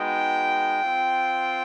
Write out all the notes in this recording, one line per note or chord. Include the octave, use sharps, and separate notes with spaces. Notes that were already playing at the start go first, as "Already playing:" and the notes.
Already playing: G#3 B3 D#4 F#4 G5
C4 F4